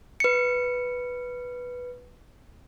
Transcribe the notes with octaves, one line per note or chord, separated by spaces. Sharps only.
B4 C#7